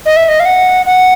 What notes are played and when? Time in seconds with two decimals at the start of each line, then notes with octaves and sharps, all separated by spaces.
0.06 D#5
0.16 E5
0.28 D#5
0.40 F5
0.45 F#5
0.86 F#5